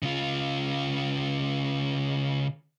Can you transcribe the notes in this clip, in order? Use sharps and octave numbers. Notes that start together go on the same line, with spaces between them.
C#3 F4